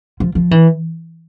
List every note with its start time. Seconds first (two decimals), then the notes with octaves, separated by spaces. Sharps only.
0.20 F3
0.35 F3
0.51 E3